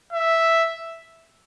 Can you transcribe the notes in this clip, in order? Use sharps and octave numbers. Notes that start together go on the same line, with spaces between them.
E5